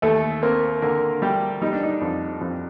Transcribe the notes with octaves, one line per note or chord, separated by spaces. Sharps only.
D#2 A3 A4
A#3 C4 A#4
D3 A#3 A#4
G3 A3 G4
G3 D#4
D4
D#4
F2
F2